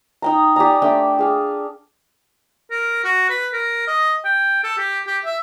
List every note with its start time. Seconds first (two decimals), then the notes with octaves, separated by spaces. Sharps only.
0.22 D#4 G5 A#5
0.56 G4 D5 G#5 A#5
0.82 A3 D4 G5
1.19 G#4 F5
2.71 A#4
3.04 F#4
3.30 B4
3.53 A#4
3.87 D#5
4.25 G5
4.64 A4
4.77 G4
5.07 G4
5.25 E5